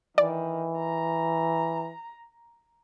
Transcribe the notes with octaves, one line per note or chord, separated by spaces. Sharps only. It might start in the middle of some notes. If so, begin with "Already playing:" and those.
D#3 E3 D5
A#5